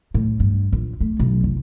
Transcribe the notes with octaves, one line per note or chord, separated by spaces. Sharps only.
A2
G2
A#1
A3
B1
F1